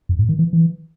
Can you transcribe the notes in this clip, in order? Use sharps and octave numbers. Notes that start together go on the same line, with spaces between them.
F#2
G#2
D#3
E3
E3